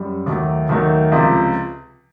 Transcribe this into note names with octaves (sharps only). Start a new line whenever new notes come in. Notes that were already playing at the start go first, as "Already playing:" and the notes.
Already playing: F#2 G3
D#2 D#3 F#3 A3
D#2 D#3 F#3 A3
C#2 C3 F3